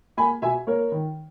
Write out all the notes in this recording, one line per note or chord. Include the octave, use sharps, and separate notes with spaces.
A#3 G#5 B5
B2 E5 G#5
A#3 A#4 C#5
D#3